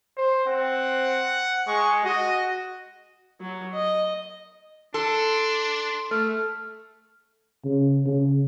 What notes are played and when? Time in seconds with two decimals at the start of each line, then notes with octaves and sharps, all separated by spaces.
0.17 C5
0.47 C4 F#5
1.68 G#3 C#6
2.04 F#4 D#5
3.41 F#3
3.74 D#5
4.94 D4 A4 C6
6.11 A3 F6
7.65 C#3
8.06 C#3